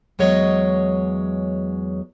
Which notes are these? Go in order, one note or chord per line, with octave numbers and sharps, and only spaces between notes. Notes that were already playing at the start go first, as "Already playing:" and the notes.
E2 F#3 G#3 C#5 D#5